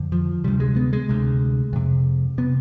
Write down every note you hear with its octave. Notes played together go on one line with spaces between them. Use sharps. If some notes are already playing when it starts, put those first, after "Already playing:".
Already playing: F2 D3
F3
D2 C3 G3
G#3
B3
G#3
D2 C3
F2 C3
C3 B3